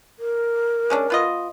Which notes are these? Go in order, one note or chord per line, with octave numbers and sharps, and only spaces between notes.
A#4
G#3 C#4 D4
B3 F4 D#5